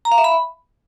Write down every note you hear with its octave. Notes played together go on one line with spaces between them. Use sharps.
A#5
F5
E5
B5